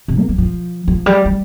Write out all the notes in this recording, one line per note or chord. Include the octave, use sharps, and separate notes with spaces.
C3
A#3
G3
F3
F3
G3
G3